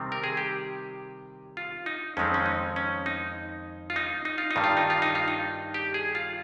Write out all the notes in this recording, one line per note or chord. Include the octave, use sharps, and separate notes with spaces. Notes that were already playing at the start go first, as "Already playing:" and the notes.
Already playing: C3 D#3 G3 C4
A#4
G#4
G4
F4
D#4
F2 D#3 G#3 C4 C#4
C#4
D#4
C#4
D#4
F4
D#4
D#4
F4
D#4
G2 D#3 G3
F4
D#4
F4
D#4
F4
D#4
G4
G#4
F4